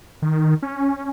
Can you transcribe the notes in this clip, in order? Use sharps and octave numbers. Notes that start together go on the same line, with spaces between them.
D#3
C#4